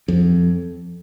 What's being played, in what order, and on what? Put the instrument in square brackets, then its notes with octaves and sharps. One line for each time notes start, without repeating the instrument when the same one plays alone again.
[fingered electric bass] F2